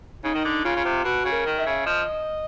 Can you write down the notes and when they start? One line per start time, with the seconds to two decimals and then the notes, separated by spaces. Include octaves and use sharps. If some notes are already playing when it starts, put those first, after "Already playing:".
0.24 C#3 D#4
0.35 D#3
0.45 D3
0.64 C#3 F4
0.76 C#3
0.85 C3
1.04 B2 F#4
1.25 C#3
1.32 A#4
1.46 D#3
1.59 E5
1.66 C#3
1.86 F3 D#5